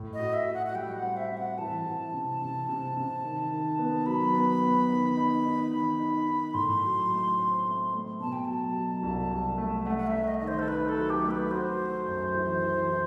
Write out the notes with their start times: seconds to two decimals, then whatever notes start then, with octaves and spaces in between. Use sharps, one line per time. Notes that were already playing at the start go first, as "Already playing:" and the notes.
Already playing: A2
0.14 D#5
0.20 F#4
0.33 E5
0.48 F#4
0.54 F#5
0.66 F#5
0.75 G3 G5
0.96 F#5
1.03 C4
1.17 E5
1.31 C4
1.37 F#5
1.58 E3 A5
1.86 E3
2.13 C3
2.41 C3
2.69 C3
2.97 C3
3.24 D#3
3.51 D#3
3.79 B3
4.06 F#3 B5
4.34 B3
4.62 B3
4.89 D#3
5.17 D#4
5.45 D#4
5.71 D#3
5.99 D#4
6.28 D#4
6.54 A2 C6
6.83 F#3
7.10 A3
7.38 C4
7.65 A3
7.93 A3
8.20 B2 A5
8.33 G5
8.45 F#3 A5
8.76 F#3
9.03 C2
9.31 C2
9.58 A3
9.86 A3 F#5
9.98 F#5
10.07 E5
10.13 A3
10.28 D#5
10.39 D#3 D#5
10.48 C5
10.59 A4
10.68 D#4 B4
10.89 A4
10.96 F#3
11.10 G4
11.24 A3
11.31 B4
11.51 F#4 C5
11.79 F#4
12.06 F#2
12.35 E3
12.62 E3
12.89 E3